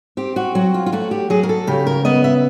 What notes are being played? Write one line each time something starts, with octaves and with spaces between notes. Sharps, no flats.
C4 G4
F#4
F#3 F#4
F4
F4
A3 F#4
G4
F#3 G#4
A#4
A4
C#3 G4
A#4
B3 D#5
E5